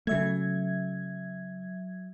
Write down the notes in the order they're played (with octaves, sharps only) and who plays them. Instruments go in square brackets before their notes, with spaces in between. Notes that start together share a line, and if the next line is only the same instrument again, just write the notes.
[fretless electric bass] C#3 A3 [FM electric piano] F#3 E5 G#6